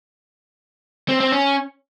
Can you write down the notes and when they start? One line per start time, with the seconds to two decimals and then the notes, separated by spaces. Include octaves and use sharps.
1.09 C4
1.20 C4
1.32 C#4